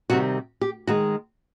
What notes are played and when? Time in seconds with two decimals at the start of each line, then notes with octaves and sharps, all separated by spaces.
0.10 C3 D#3 G3 C4 F#4
0.61 G4
0.87 D#3 G#3 F#4